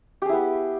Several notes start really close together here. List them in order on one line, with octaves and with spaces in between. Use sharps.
G4 G#4 E4 B3